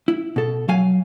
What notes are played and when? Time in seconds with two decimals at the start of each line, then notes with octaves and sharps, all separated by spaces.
0.08 E4
0.36 B2 A4
0.68 F#3 F5 G#5